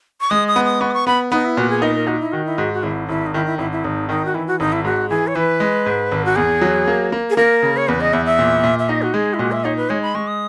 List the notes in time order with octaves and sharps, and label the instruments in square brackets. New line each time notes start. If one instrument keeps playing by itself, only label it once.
[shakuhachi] C#6
[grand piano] G#3 [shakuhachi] D#6
[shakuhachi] D#6
[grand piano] B3
[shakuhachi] D#6
[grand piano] B3 [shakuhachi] C#6
[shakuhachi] D#6
C#6
[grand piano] B3 [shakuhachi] B5
[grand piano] B3 [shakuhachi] D#4
[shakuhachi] E4
[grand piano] A#2 [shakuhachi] F#4
[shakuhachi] G#4
[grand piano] D#4 [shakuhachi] A#4
[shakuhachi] A#4
[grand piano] D#4 [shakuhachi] F#4
[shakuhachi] E4
[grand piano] D#3 [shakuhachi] F#4
[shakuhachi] E4
[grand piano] G#2 [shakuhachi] F#4
[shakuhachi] F#4
[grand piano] G#1 [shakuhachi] E4
[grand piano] G#1 [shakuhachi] E4
[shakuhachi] D#4
[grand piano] D#3 [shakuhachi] E4
[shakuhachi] E4
[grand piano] G#1 [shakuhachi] E4
[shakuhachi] E4
[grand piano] G#1 [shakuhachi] D#4
[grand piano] D#3 [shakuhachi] D#4
[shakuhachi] F#4
[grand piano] E3 [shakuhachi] E4
[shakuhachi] F#4
[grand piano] G#1 [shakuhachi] D#4
[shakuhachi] E4
[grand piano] G#2 [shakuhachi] F#4
[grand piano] E3 [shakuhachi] G#4
[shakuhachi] C#5
[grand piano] E3 [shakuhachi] B4
[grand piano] G#3
G#2
G#1
[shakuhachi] F#4
[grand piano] E2 [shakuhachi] G#4
[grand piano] F#3
A#3
A#3
[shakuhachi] G#4
[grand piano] A#3 [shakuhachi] A#4
[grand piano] C#3
[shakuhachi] C#5
[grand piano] E2 [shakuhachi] B4
[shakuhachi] D#5
[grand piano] E2 [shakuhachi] E5
[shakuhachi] E5
[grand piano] A#2
A#2
[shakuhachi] E5
[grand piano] D#4 [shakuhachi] D#5
[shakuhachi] F#4
[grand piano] G#3 [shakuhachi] G#4
[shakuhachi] E4
[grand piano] A#2 [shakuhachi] F#4
[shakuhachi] E5
[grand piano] D#4 [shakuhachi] C#5
[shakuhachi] B4
[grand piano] G#3 [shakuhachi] C#5
[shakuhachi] B5
[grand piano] G#3 [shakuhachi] C#6
[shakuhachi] D#6